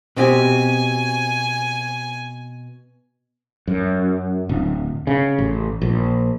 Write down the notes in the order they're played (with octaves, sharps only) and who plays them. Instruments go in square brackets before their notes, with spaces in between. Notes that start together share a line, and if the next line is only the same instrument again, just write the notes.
[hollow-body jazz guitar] B2 C4 G4 [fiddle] G#5
[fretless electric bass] F#2
D1
C#3
A1
A#1